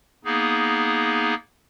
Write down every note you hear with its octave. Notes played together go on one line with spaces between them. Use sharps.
A#3 B3 D#4 G#4